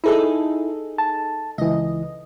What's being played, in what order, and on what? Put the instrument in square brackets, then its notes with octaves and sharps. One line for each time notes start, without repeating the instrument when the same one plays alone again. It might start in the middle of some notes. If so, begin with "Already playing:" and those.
[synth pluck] D#4 G#4 A4 [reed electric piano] E4
[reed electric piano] A5
[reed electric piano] C#2 E3 [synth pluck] D#5